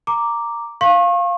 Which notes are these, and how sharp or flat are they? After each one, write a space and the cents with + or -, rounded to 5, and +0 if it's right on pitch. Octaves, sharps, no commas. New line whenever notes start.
A#5 -5 D6 +0
F5 +0 C#6 -40